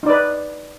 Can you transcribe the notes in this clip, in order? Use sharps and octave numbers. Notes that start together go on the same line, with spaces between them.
D#4 B4 D5